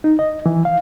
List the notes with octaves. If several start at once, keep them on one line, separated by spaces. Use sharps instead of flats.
D#4
D#5
E3
F5